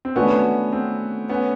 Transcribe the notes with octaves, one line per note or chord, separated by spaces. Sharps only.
C4
A3 B3 C#4 D4 F#4 B4
C4
B3 C#4